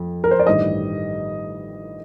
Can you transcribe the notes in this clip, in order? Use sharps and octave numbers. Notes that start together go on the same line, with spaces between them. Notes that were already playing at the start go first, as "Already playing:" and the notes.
Already playing: F2 F3
A#4
C5
D5
A1 G2 D#3 G3 D#5